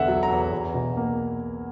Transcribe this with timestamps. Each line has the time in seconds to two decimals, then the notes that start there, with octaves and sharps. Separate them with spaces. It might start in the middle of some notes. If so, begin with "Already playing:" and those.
Already playing: E2 D3 B3 E5 F#5
0.08 F#3
0.23 A#5
0.29 E2
0.52 E2
0.74 B2
0.97 A#3